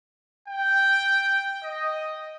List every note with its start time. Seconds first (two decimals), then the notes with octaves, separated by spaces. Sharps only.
0.48 G5
1.62 D#5